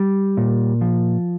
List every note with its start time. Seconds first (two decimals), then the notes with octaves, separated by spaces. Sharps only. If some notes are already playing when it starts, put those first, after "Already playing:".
Already playing: G3
0.37 A#2
0.81 F3